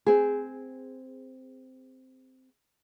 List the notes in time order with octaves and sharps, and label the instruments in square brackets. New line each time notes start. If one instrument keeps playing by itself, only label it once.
[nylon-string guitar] C4 G#4